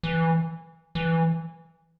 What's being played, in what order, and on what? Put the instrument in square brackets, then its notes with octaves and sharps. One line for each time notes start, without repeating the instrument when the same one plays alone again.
[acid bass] E3
E3